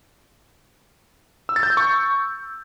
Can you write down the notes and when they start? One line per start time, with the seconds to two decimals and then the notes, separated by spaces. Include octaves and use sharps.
1.49 E6
1.56 A6
1.63 G6
1.70 E6
1.77 C#6